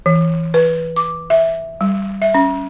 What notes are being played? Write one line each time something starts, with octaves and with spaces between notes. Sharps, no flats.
E3
B4
D6
E5
G3
E5
C#4